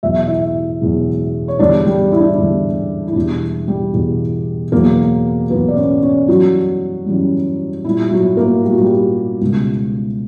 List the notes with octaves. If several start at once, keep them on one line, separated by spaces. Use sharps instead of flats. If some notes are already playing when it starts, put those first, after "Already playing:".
E2 B2 F#3 E5
E4 E5
E2 B2 F#3
C#5
E2 D3 G3 D4 D5
G3 G4
E4
D4
E4
E2 D3 G3
E4
E2 B2 G3 D4
G3 G4
E2 B2 G3
E2 B2 F#3 A#3 A#4
E2 B2 F#3 B3 B4
D5
C#4 C#5
C#4 C#5
F#2 E3 F#3 G3 F#4
F#2 E3 G3
A#2 G3 E4
E4
F#3 F#4
A#3 A#4
A#2 G3 G4
F#4
G3 G4
C#2 B2 G3